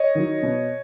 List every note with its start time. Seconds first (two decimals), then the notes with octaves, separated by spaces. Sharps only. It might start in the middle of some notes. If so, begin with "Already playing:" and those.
Already playing: C#5 D#5
0.15 D#3 F#3
0.43 B2